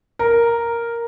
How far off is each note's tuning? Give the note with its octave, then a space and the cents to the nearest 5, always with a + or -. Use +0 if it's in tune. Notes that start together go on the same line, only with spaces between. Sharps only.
A#4 +0